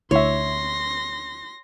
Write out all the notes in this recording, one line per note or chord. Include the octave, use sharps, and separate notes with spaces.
D2 E4 C#5 E5 C6 A#6